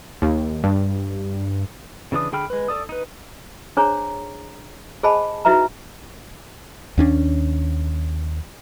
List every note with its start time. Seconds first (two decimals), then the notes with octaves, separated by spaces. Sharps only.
0.22 D#2
0.64 G2
2.12 C#3 E3 D4 D#6
2.32 D3 G#4 G5 B5 F6
2.50 G#3 B4
2.68 A4 D5 D#6
2.89 D#4 B4
3.77 D4 G#4 C5 C#5 A#5
5.03 G#4 C5 D#5 G#5 A5 B5
5.45 D#4 E4 F#4 B4 E5 A#5
6.98 D#2 C#4 D4